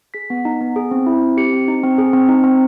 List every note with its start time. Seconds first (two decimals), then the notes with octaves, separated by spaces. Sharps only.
0.14 G#4 B6
0.30 B3
0.45 D#4
0.61 B3
0.76 G#4
0.91 C4
1.06 E4
1.22 C4
1.37 G4 C#7
1.53 C4
1.68 D#4
1.84 C4
1.98 G#4
2.13 C4
2.29 D#4
2.44 C4